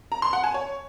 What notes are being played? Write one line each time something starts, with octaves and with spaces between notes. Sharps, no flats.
A#5
C6
F#5
G#5
C#5